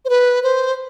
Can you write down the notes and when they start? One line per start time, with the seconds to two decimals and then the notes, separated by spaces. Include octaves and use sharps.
0.05 C5
0.09 B4
0.43 C5